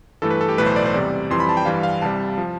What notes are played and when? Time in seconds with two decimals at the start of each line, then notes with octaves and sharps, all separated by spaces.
0.22 G2 E3 A3 A4
0.31 B4
0.41 A4
0.49 G4
0.58 B1 A2 E3 A3 B4
0.66 C5
0.76 D5
0.86 C5
0.94 E2 C3 G3 D5
1.30 F2 E3 G3 C6
1.40 B5
1.49 A5
1.57 G5
1.65 G2 E3 G3 F5
1.83 F5
2.02 C2 C3 G3 A5
2.38 F3